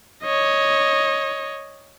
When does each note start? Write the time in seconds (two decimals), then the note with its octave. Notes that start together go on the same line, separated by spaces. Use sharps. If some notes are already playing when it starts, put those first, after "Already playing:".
0.24 C#5 D#5